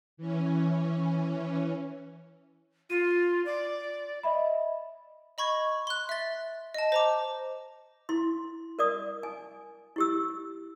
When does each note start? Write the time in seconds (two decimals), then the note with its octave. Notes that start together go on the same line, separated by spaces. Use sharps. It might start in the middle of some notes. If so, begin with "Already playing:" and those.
0.17 E3 C#4
2.90 F4 D#7
3.46 D5
4.23 D#5 E5 B5
5.38 D#5 B5 C#6 G#6
5.87 C6 F#6
6.09 E5 A6
6.74 D#5 A5
6.92 C5 A#5 D6
8.09 E4 C6
8.79 A#4 D5 D#6
9.23 G#5
9.96 E4 G4 E6